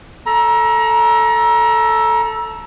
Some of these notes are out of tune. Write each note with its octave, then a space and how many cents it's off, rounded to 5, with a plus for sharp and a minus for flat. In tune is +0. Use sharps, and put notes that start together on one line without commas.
A4 +0 A#5 +30